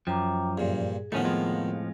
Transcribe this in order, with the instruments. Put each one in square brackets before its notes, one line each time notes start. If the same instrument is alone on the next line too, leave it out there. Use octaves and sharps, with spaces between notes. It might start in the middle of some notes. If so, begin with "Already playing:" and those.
[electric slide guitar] F#2 [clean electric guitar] F3 [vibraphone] G5 A#5 D6
[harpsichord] G2 A#2 [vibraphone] G#4
[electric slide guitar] A2 F3 [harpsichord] D#3 B3 [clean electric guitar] A3 C#4
[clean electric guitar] F2 G#3 F4